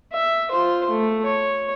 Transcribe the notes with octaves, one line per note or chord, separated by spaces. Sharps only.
E5
F4 C5
A3
C#5